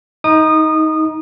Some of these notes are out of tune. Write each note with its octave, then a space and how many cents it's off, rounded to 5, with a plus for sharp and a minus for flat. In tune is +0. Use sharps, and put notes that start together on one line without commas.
D#4 +20 D#6 -25